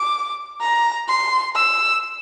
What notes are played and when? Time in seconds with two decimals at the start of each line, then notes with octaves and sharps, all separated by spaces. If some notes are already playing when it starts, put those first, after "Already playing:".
Already playing: D6
0.61 A#5
1.09 C6
1.56 E6